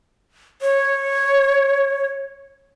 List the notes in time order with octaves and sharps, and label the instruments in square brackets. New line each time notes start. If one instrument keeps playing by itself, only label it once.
[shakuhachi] C#5